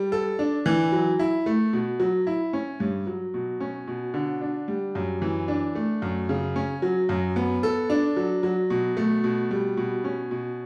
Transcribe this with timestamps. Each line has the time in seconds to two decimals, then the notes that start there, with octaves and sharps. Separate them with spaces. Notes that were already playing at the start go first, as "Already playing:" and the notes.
Already playing: G3
0.12 A4
0.39 D4
0.66 E3
0.92 F#3
1.19 E4
1.46 A3
1.73 B2
2.00 F#3
2.27 E4
2.53 C#4
2.80 G2
3.07 F#3
3.34 B2
3.60 C#4
3.87 B2
4.14 D3
4.41 D4
4.68 G3
4.95 F#2
5.22 E3
5.48 D4
5.75 A3
6.02 F#2
6.29 C#3
6.56 C#4
6.82 F#3
7.09 F#2
7.36 B3
7.63 A4
7.90 D4
8.16 F#3
8.43 F#3
8.70 B2
8.97 A3
9.24 B2
9.51 G3
9.77 B2
10.04 C#4
10.31 B2